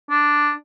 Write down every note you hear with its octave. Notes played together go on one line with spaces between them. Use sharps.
D4